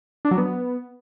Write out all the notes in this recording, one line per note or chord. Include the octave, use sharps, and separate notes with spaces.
D4
F#3
B3